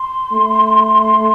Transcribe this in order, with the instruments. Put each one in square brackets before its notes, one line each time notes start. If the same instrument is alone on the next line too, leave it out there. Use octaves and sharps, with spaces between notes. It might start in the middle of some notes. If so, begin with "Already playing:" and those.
Already playing: [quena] C6
[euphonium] A3